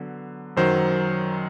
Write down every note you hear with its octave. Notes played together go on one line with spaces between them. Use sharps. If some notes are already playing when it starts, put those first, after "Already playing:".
Already playing: D3 F#3 B3
F#2 D#3 F#3 C5